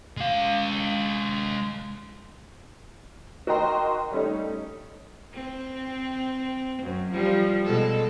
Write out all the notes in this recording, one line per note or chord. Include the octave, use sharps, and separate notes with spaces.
G#3 F5
F#4 A#4 D#5 G5 A#5 C6
G3 A3 C#4 D#4
C4
F#2
F3 G3
B2 G#3 A4